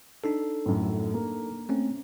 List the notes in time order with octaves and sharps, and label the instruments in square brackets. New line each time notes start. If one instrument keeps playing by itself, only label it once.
[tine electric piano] D4 D#4 A4
[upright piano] F#2 A2
A#3
[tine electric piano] A3 C4 C#4